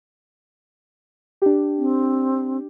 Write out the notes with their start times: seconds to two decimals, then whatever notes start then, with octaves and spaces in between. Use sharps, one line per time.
1.42 D4 G4
1.79 C4